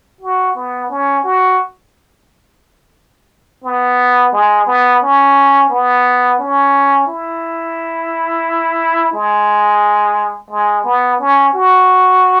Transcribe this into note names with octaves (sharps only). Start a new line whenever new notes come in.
F#4
B3
C#4
F#4
B3
G#3
B3
C#4
B3
C#4
E4
G#3
G#3
B3
C#4
F#4